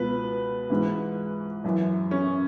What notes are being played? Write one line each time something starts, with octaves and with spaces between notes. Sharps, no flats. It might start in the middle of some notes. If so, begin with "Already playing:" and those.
Already playing: C#2 B2 B4
G#2 E3
F#2 E3
C#4